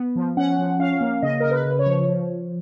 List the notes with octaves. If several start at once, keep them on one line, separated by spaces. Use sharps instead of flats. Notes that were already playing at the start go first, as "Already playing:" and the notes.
Already playing: B3
F3
C#4 F#5
F3
C#4 F5
A#3
C#3 D#5
C#3 A#4
B4
C#3
C#5
F3
F3